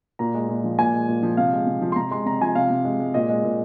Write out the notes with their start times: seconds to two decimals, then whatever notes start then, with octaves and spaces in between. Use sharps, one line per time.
0.19 A#2 A#5
0.34 G#3
0.49 A#2
0.64 F3
0.79 A#2 G#5
0.94 G#3
1.09 A#2
1.23 F3
1.37 C3 F5
1.53 G#3
1.67 C3
1.82 F3
1.92 C6
1.96 C3 A#5
2.11 G#3 C6
2.26 C3 A#5
2.41 F3 G#5
2.55 C3 F5
2.70 C3
2.85 G#3
3.00 G#3
3.14 A#2 D#5
3.29 G#3
3.44 A#2